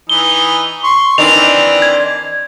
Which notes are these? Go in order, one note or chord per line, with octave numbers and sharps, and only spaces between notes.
E3 D#4 G7
C6 C#6
D#3 E3 C4 D4 D5 F7
G#6